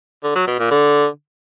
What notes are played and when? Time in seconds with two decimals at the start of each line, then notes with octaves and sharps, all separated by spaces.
0.23 D3
0.35 F#3
0.47 B2
0.59 A#2
0.71 D3